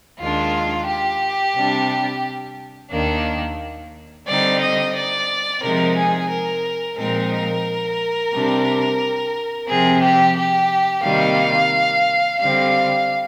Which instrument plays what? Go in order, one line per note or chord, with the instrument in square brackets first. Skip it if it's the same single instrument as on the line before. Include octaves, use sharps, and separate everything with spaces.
[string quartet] D#2 D#3 G#3 D4 F4
G4
C3 G3 D4
D#2 D#3 A#3 D4
D3 G3 C4 D#4 D5
D#5
D5
C3 F3 G#3 D#4 A#4
G#4
A#4
A#2 F3 G#3 C4 D#4 A#4
C3 G3 D4
C3 F3 C4 G#4
G4
G4
C3 D#3 G3 A#3 F5
D3 G3 C4 F5